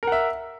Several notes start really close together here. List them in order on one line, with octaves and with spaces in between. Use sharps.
A#4 F#5 E5